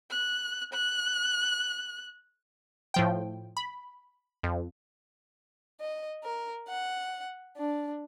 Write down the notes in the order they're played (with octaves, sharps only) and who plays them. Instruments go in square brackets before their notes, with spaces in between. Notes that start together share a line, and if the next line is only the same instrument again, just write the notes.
[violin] F#6
F#6
[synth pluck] A2 F3 G5
B5
F2
[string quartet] D#5
A#4
F#5
D4